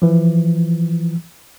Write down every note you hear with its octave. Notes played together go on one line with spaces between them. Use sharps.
E3 F3